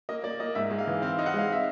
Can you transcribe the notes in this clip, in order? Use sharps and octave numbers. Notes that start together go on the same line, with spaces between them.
A#3 D#5
A#3 D5
A#3 D#5
G#2 E5
G#3
F5
E3
C4 F5
D#4
F#5
G#3 F5
E5